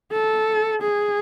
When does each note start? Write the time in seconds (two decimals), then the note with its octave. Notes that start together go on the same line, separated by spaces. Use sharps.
0.13 A4
0.82 G#4